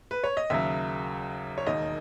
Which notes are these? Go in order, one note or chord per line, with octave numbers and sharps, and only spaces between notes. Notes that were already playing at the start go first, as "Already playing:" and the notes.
B4
C#5
D#5
D#2 C#3 F#3 E5
C#5
E1 D#2 D#3 D#5